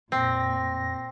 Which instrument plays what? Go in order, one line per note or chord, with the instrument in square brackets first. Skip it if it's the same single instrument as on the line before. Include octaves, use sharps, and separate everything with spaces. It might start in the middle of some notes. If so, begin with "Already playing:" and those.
[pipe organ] F2 A#6 [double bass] A#2 [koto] C4